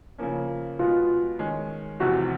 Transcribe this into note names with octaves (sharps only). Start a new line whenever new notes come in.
C#3 F3 A#3 C#4
B2 G#3 B3 F4
D#3 G#3 C#4
F1 E2 C3 F#4